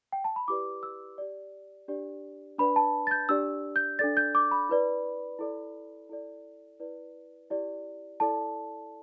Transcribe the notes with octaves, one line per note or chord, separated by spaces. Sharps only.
G5
A5
B5
E4 G4 B4 D5 D6
E6
G4 D5
D4 G4 D5
D4 B4 D5 B5
A5
A6
G6
D4 G4 D5 E6
G6
D4 A4 D5 A6
G6
D6
B5
E4 B4 D5
E4 A4 D5
E4 A4 D5
E4 B4 D5
E4 G4 D5
E4 A4 D5 A5